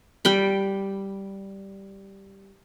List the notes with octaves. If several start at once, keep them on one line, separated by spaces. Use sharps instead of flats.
G3 G5 B5